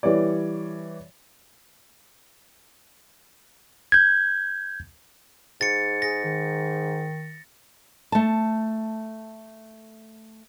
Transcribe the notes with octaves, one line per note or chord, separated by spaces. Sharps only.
E3 G3 C#5 D5
G6 G#6
G#2 A6 C#7
G#4 A#6
D#3
A3 A5